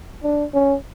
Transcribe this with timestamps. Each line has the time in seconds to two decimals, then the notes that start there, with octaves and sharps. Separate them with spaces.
0.24 D4
0.54 C#4